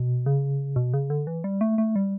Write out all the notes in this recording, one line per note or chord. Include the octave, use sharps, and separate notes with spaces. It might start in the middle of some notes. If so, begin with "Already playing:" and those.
Already playing: B2
C#3
B2
C#3
D3
E3
G3
A3
A3
G3